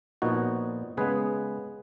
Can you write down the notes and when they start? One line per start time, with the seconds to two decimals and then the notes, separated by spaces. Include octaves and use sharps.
0.22 A#2 F3 B3 D#4 F#4
0.97 C#3 G#3 B3 G#4 B4